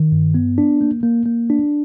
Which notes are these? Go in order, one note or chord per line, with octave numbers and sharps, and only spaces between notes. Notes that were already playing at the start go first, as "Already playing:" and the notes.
Already playing: D#3
G2
B3
D4
A#3
A#3
A#3
D4